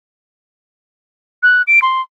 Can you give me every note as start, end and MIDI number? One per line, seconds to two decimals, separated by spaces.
1.43 1.62 90
1.67 1.79 98
1.82 2.01 84